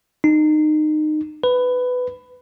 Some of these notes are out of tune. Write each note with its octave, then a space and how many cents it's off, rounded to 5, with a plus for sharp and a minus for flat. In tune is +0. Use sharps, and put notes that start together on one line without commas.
D#4 -25
B4 +15